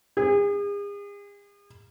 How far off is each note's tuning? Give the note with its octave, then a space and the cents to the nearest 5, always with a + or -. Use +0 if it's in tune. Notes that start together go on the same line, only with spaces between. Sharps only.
G#4 -40